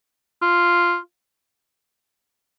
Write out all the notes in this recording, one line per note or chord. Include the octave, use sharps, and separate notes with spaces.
F4